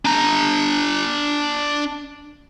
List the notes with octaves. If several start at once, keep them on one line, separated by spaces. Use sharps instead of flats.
D4 A#5